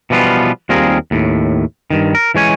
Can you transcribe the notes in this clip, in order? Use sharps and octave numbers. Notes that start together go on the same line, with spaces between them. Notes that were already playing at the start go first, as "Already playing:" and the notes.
B2 E3 F3 G3 B3 F4
D#2 G3 C4 F4 G#4 A#4
D#2 A2
G2 D#3
A#4
E3 G#3 C#5 G#5